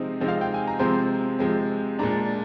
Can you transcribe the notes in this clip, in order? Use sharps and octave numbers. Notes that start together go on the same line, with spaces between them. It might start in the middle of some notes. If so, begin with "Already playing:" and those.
Already playing: C3 F3 G#3 C4 D#4
C3 F3 G#3 C4 D#4
F5
G5
G#5
A#5
C3 F3 G#3 C4 C6
C3 F3 G#3 C4
A#2 G#3 D4 A#5